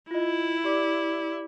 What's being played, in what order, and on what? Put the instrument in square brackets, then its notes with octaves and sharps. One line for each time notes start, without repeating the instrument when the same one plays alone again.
[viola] E4 [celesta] F4 D#5
[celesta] G4 D5 D6